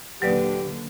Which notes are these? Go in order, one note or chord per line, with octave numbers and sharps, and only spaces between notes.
D#2 A#2 D3 F#3 G4 B4 D5